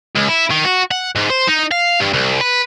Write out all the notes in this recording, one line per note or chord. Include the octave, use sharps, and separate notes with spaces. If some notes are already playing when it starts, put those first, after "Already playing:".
C#2
E4
D#3
F#4
F#5
G#2
C5
D#4
F5
G2
C2
B4